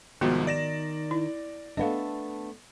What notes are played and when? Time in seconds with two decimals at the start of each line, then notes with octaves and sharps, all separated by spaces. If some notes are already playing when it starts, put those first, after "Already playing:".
0.21 C2 G#2 D#3 F3 B3 F#4
0.47 D5 A#6 E7
1.11 E4
1.77 A3 B3 D4 D#5 F5